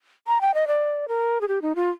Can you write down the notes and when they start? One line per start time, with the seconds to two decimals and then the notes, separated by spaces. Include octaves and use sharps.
0.27 A#5
0.41 G5
0.54 D#5
0.67 D5
1.08 A#4
1.41 G#4
1.48 G4
1.62 D#4
1.76 F4